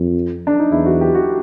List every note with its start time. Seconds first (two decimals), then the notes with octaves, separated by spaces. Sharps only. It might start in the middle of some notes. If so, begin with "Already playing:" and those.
Already playing: F2
0.47 D4
0.59 D#4
0.71 E2 E4
0.86 F#4
1.01 G4
1.15 F#4